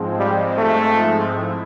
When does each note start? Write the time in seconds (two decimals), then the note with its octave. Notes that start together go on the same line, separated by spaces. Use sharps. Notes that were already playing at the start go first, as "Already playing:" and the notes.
Already playing: G#2 F3 G#3 C4
0.19 G3
0.58 A3
1.34 E4